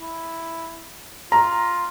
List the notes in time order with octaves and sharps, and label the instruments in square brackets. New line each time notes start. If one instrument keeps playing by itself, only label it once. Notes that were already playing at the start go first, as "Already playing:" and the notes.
[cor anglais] E4
[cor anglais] F4 [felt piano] A#5